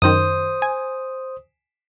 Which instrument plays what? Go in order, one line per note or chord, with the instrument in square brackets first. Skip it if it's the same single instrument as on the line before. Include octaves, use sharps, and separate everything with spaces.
[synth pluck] F#2 D#3 [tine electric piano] C5 D#6
[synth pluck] G#5